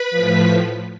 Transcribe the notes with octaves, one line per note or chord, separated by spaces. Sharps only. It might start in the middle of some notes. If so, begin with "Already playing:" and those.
Already playing: B4 B5
A2 F3